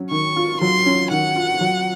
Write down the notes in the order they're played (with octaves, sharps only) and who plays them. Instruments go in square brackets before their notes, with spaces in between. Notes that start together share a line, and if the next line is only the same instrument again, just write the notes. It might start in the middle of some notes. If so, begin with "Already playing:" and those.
Already playing: [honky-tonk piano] F#3 C#4
[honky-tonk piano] D#3 [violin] C#6
[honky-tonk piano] F4
[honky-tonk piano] F#3 [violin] C6
[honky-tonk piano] C#4
[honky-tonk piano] D#3 [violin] F#5
[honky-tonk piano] F4
F#3